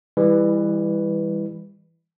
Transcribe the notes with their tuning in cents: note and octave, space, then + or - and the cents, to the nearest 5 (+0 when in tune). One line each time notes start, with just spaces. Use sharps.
E3 +0 G3 +35 B4 +0